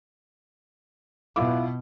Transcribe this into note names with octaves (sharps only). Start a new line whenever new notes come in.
B2 E4 F4 D6